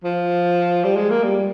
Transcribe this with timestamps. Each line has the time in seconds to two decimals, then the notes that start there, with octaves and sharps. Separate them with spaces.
0.04 F3
0.84 G3
0.96 G#3
1.10 A#3
1.23 G3